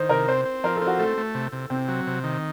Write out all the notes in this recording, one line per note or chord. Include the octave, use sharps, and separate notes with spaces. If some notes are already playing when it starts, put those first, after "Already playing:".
Already playing: D#3 C5
C3 A#4
C4 C5
C4
F3 A#4
A4
C4
F#4
A3 A4
A3
C3
C3
C3 C4
F#3
C3
D#3